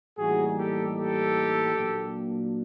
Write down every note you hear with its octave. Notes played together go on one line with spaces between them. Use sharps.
A2 E3 G3 A#3 D#4 F#4 G#4
G4 A4
G4 A4
A#2 F#3 A#3 D4